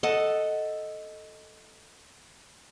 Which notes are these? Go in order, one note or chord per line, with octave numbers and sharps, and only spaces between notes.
A4 D#5 F#5